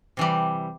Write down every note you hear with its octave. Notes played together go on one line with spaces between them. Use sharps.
C3 E3 G3